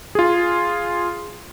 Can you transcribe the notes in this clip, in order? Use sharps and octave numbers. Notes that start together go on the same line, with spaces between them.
F4 G#4